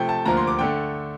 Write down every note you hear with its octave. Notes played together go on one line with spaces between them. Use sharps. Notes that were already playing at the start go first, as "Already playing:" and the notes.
Already playing: C3 F3 A3 G5
A5
D2 D3 F3 A#3 A#5
C6
D6
D3 A3 G5